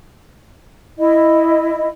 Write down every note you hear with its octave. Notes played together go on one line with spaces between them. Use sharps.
E4 D#5